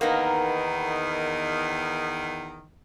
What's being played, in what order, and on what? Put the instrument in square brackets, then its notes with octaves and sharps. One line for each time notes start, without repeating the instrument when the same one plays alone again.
[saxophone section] E2 D#3 [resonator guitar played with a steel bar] A#3 B3 D#4